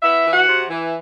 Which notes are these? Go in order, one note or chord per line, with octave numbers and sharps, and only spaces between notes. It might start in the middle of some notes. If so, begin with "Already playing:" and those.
B3 E4 E5
E3
F#4 F#5
C3
E3